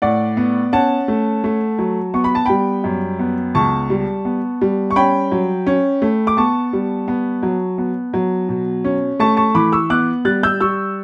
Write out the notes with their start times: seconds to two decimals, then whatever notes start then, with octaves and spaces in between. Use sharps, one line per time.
0.02 A2 D5 F#5
0.37 B3
0.73 C#4 F#5 A5
1.08 A3
1.44 A3
1.79 F#3
2.14 B3 C#6
2.24 B5
2.35 A5
2.45 G3 G5 B5
2.84 F#2
3.19 B3
3.55 C#2 A5 C#6
3.90 G3
4.25 B3
4.61 G3
4.91 C#6
4.96 C#4 G5 B5
5.32 F#3
5.67 C#4
6.02 A3
6.27 D6
6.37 B3 A5 C#6
6.73 G3
7.08 B3
7.43 F#3
7.78 B3
8.14 F#3
8.49 B2
8.84 C#4
9.19 A3 A5 C#6
9.37 A5 C#6
9.55 E3 B5 D6
9.72 C#6 E6
9.90 B3 D6 F#6
10.25 G3 F#6 A6
10.43 E6 G6
10.61 G3 C#6 E6